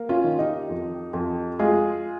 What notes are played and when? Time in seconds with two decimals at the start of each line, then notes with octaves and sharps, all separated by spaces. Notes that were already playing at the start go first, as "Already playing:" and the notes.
Already playing: A#3
0.09 C#4 F4
0.24 D#3
0.38 D#4 G4
0.69 F2
1.13 F2
1.59 G#3 F4 G#4